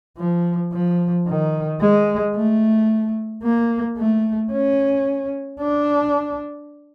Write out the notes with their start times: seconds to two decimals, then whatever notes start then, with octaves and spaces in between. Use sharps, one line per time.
0.18 F3
0.73 F3
1.27 D#3
1.81 G#3
2.36 A3
3.43 A#3
3.97 A3
4.52 C#4
5.60 D4